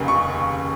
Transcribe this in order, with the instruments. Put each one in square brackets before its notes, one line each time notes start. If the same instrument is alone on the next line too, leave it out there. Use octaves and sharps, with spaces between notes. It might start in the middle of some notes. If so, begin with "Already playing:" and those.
Already playing: [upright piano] F1 D#2 C#3
C#6